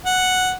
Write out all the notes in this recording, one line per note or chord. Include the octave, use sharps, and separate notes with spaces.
F#5